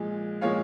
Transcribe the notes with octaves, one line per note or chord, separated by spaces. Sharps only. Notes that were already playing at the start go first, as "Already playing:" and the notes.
Already playing: A#2 F3 G#3
A#2 F3 G#3 C#5 F5